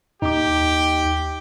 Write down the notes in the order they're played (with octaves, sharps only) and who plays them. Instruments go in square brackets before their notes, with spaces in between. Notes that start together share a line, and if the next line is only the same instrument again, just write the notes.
[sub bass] D#2 [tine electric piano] D#4 D6 [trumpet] G4